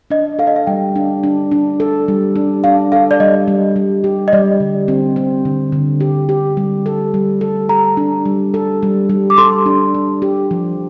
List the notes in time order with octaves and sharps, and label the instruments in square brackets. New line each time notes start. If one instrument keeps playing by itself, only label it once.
[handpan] D4 [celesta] D#5
[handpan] A4 [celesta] F5
[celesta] D#5
F5
[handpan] G3 [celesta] G5
[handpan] D4
D4
D4
A4
G3
D4
[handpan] D4 [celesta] F5
[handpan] A4 [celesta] F5
[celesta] D5
[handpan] G3 [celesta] D#5
[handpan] G3
G3
G4
[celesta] D#5
[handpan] G3 [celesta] D5
[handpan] D3
C4
C4
D3
D3
G4
G4
G3
A4
G3
A4
[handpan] A4 [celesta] A#5
[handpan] D4
G3
A4
G3
G3
[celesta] D6
[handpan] A4 [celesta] C6
[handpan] D4
D4
G4
F3